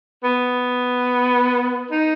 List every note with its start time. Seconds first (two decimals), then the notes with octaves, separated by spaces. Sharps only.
0.24 B3
1.91 D#4